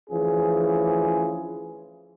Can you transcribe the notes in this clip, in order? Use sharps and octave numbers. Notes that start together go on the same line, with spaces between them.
D2 E3 F3 C#4 F4 G#4